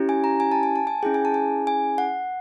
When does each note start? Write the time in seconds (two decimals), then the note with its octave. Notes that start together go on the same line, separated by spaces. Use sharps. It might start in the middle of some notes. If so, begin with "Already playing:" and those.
Already playing: C#4 E4 G4
0.09 G#5
0.24 A#5
0.40 G#5
0.52 A5
0.63 G#5
0.76 A5
0.87 G#5
1.03 C#4 E4 G#4 G5
1.14 G#5
1.25 A5
1.34 G#5
1.67 G#5
1.98 F#5